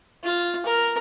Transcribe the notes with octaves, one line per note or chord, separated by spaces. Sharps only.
F4
A#4